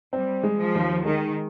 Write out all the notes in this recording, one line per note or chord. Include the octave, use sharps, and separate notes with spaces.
G3 C4
G#3
F3
D#2
D#3 G#3